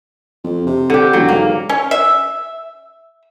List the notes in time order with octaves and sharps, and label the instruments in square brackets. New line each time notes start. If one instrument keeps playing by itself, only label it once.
[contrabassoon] F2
C3
[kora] D3 G4
[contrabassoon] E1 [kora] F#3
[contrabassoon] G#2 [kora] A#3
[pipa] C#4
E5